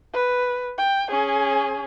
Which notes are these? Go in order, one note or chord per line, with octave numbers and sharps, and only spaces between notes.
B4
G5
C#4 G#4